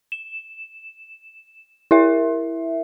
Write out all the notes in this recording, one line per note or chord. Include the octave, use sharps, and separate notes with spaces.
E7
E4 A#4 E5